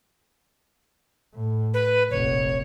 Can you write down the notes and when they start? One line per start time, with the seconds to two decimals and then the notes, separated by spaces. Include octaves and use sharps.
1.34 A2
1.74 B4
2.11 F1 A#1 C#5